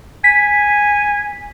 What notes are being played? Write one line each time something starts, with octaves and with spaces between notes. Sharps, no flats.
G#5 B6